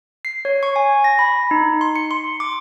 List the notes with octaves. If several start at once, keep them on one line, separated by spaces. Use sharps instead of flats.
C7
C#5
C#6
G#5
A#6
B5
D#4
C6
C#7
C6
D6